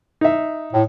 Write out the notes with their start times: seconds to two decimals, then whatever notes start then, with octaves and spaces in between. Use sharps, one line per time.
0.21 D#4 E5
0.73 A2